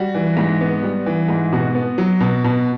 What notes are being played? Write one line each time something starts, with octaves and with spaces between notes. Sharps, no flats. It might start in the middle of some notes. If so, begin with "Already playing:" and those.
Already playing: G3 F#4
E3
G#2
B3
G3
E3
G#2
B2 F#4
B3
F#3
B2
B2